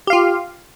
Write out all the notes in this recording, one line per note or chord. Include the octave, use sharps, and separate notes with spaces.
F4 G4 F5